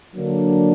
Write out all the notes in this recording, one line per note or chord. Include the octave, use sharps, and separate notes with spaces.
D3 F#3 A#3 D4